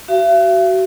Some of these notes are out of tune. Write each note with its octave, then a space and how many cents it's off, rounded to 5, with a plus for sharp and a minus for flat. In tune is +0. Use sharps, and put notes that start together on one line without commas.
F#4 +30 E5 +45